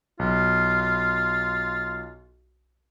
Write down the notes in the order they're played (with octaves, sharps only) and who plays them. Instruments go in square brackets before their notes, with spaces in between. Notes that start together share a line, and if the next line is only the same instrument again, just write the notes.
[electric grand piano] B1 [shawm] F4